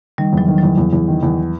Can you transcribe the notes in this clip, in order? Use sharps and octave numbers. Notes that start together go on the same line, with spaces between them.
D#3 G3
E2 F#3
D#3
E2 F#3
E2
E2
D#3
E2